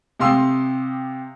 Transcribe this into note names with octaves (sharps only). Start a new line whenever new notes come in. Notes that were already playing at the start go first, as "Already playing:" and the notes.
C3 G4 F5 C6 D#6 E6